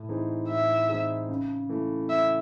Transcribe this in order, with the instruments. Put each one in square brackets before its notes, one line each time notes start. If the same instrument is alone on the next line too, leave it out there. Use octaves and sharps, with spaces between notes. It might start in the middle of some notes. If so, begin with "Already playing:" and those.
Already playing: [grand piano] A2
E3 C4 D#4 G#4
[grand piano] A2 [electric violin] E5
[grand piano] E3 C4 D#4 G#4
C#3
E3 A3
[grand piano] C#3 [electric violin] E5